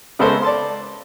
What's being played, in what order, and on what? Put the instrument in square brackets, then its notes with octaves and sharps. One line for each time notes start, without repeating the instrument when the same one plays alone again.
[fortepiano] C#3 G#3 B3 A4 A#4 C5
D5 A5 C6